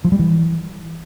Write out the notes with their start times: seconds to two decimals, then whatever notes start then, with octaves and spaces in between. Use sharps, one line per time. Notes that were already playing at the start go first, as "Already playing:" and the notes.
0.05 F3
0.12 G3
0.19 E3